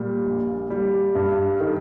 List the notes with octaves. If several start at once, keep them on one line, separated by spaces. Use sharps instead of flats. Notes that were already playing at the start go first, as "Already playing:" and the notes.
Already playing: A#2 G3
A#1
G3
G2
D#3